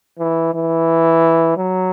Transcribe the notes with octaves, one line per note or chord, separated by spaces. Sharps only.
E3
E3
F#3